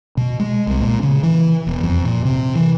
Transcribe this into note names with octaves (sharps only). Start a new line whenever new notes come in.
B2
G#3
C2
A#2
C#3
E3
E1
F2
A#2
C3
E3